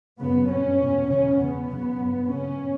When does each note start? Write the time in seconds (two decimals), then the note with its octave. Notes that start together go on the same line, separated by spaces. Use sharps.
0.20 F#2 C#3 B3
0.49 G2 C#4
0.79 E2 B2
1.08 E2 C#3 C#4
1.38 E2 C#3 B3
1.68 F#2 C#3
1.97 G2
2.26 F#2 C#3 C#4